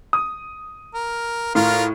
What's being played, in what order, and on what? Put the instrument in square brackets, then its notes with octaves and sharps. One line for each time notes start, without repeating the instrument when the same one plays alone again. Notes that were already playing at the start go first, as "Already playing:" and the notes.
[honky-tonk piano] D#6
[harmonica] A#4
[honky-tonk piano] A2 [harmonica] F4 A#4